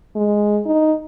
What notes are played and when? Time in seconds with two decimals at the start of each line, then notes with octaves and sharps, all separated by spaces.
0.16 G#3
0.66 D#4